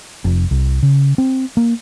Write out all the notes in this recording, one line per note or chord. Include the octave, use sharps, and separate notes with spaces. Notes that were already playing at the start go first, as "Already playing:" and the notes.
F1
C2
C#3
C4
A#3